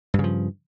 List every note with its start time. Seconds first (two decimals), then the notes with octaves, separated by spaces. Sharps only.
0.14 G2
0.19 C#3
0.24 F3